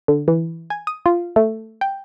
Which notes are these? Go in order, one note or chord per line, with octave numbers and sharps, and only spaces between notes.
D3
E3
G#5
D#6
F4
A3
G5